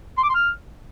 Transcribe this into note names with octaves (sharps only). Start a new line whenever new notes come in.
C6
D6
C6
F6